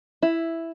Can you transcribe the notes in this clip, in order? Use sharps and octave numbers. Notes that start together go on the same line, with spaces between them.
E4